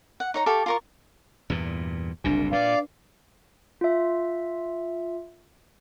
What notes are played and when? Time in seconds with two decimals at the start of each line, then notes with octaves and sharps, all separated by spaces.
0.20 F#5
0.34 D#4 C#5 A#5
0.46 G4 A4 F5 C#6
0.66 F4 A#4 C#6
1.50 E2 G2 A#2
2.24 F#1 C2 A#2 D4
2.52 A#2 B4 D5 F5
3.81 F4 E5